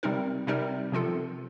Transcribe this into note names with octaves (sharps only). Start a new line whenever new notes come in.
C3 G3 C4 D#4 A#4
C3 G3 C4 D#4 A#4
C3 F3 C4 F4 A4